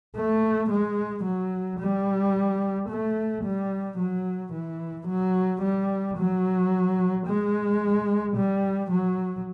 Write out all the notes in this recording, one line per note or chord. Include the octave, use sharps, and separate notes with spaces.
A3
G#3
F#3
G3
A3
G3
F#3
E3
F#3
G3
F#3
G#3
G3
F#3